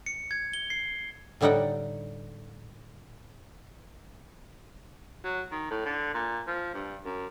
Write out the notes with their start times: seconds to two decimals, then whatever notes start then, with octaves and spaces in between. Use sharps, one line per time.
0.06 C#7
0.31 G#6
0.53 G7
0.70 C7
1.41 A2 D3 G3 D#4 F#5 G5
5.25 F#3
5.52 D#3
5.71 A2
5.85 D3
6.14 A#2
6.47 F3
6.74 G2
7.05 F#2